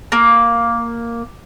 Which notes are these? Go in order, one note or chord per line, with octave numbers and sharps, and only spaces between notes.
A#3